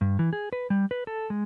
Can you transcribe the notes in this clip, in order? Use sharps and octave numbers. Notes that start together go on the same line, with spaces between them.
G2
E3
G#4
B4
G3
B4
A4
G#3